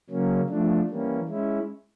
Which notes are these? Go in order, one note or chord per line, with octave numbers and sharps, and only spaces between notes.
C#3 F#3 A#3 C#4
F3 A3 D4
E3 G3 A#3 C#4
G#3 C#4 E4